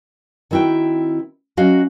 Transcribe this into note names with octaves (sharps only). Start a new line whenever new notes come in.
D#3 C4 E4 F#4 G5
F#3 C#4 F#4 D#5 F5